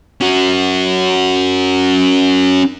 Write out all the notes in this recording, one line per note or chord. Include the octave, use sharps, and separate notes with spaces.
C#4 F#4